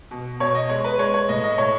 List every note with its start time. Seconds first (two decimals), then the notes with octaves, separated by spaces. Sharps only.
0.11 B2
0.40 B2 C#5
0.55 D#5
0.69 G#3 C#5
0.84 B4
0.99 G#3 C#5
1.14 C#5
1.29 A2 D#5
1.44 D#5
1.58 A2 C#5